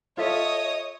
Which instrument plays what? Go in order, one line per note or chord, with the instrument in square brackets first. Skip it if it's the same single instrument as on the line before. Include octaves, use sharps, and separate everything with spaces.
[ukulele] F4 A4 E5 [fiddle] C#5 D#6 [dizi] D#5